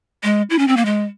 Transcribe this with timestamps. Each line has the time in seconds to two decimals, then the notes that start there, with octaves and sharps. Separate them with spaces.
0.23 G#3
0.50 E4
0.59 C#4
0.68 C4
0.77 A#3
0.85 G#3